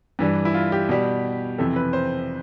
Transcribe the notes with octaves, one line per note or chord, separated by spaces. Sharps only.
G2 E3 G3
E4
F4
G4
B2 G3
F2 C3 E3 A4
B4
C5